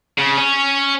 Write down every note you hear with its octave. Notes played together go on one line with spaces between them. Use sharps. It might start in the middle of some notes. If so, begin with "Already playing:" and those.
C#3
C#4